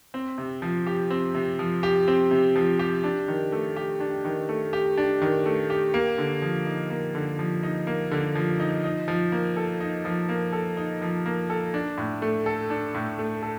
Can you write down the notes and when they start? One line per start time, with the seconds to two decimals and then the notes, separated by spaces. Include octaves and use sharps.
0.14 C4
0.38 C3
0.62 F3
0.87 G4
1.10 C4
1.35 C3
1.59 F3
1.83 G4
2.08 C4
2.31 C3
2.56 F3
2.79 G4
3.04 D4
3.28 D#3
3.52 A3
3.76 G4
4.00 D4
4.25 D#3
4.49 A3
4.73 G4
4.98 D4
5.22 D#3
5.46 A3
5.70 G4
5.94 A#3
6.18 D3
6.42 F3
6.66 D#4
6.90 A#3
7.15 D3
7.39 F3
7.63 D#4
7.87 A#3
8.11 D3
8.35 F3
8.60 D#4
8.84 D#4
9.08 F3
9.32 A#3
9.57 A4
9.80 D#4
10.05 F3
10.29 A#3
10.53 A4
10.77 D#4
11.02 F3
11.26 A#3
11.50 A4
11.74 D4
11.98 A2
12.22 A3
12.46 A4
12.70 D4
12.94 A2
13.19 A3
13.42 A4